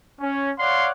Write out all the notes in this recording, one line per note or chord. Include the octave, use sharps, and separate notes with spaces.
C#4
C#5 D5 F5 F#5 C6